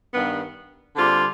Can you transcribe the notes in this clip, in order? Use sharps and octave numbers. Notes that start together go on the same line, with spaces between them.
G2 D#3 G3 B3
D3 G3 C4 F4 G#4